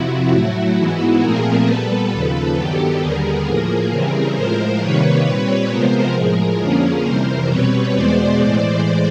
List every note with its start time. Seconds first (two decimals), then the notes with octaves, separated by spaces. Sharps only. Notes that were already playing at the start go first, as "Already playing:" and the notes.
Already playing: F2 C3 F3 E4 F#4
0.32 A2 F#3 A3
0.77 G#2 E3 G#3 B3
1.22 A#2 F3 A3 C4 G#4 A#4
1.66 A#2 G3 B3 A4 B4
2.12 D#2 C#3 F3
2.56 G2 D#3 F#3 B3 G4 A4
3.01 D#2 D3 G3 B3 G#4 A#4
3.46 A2 F3 A#3
3.90 C#3 E3 G3 C4
4.35 A2 F3 G#3 A#4 C5
4.80 C3 D#3 G3 A#3 B4 C#5
5.26 A#2 G3 C4
5.70 C3 F3 G#3 B3 A#4 C5
6.15 A2 F3 G#3 G#4 A#4
6.60 F2 D3 F3 A#3 C#4
7.04 F2 C3 E3 G3 A#4 C5
7.49 B2 G3 C4 B4 C#5
7.94 E2 B2 G#3 B3 C5 D5
8.39 A2 E3 G#3 C5 D5